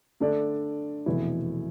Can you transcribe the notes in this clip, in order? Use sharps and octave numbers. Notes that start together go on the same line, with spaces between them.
D3 A3 D4 A4 D5
F1 E2 B2 B3 E4